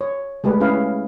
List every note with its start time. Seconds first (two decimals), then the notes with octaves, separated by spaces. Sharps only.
0.01 C#5
0.44 G#3 A3 G4 B4 D5
0.60 C#4 E4 G#4 B4 F5